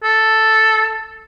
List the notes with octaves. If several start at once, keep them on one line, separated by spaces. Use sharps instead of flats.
A4